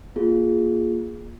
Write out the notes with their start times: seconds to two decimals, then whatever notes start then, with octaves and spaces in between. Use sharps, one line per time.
0.16 A#3 F4 G#4